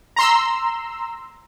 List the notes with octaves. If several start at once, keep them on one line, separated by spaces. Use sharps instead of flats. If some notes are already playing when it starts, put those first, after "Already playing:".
A#5 C6 E6